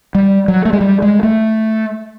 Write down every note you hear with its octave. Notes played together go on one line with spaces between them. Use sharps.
G3
F#3
A3
G#3
G3
G#3
A3